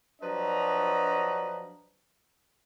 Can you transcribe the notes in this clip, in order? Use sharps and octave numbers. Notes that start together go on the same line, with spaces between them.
F3 F#3 D4 B4 D#5 A#5